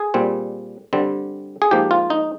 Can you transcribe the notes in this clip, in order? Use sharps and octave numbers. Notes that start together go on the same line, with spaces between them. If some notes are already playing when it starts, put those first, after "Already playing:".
Already playing: G#4
A#2 G3 C4
D3 G3 C4
G#4
G#2 F3 A#3 G4
F4
D#4